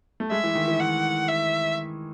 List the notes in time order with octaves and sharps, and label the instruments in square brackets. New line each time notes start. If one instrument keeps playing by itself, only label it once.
[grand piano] A3
[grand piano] G#3 [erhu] E5
[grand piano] E3
D#3
E3
[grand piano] D#3 [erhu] F#5
[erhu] E5